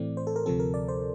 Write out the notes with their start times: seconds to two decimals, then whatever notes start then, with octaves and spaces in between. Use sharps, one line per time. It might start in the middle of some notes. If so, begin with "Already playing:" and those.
Already playing: A2 E3 A3 C4 D5
0.17 C5
0.27 A4
0.36 A#4
0.46 D2 C3 F3 C4 A4
0.59 A#4
0.74 D5
0.88 C5